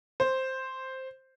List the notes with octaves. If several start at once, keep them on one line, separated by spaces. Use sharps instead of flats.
C5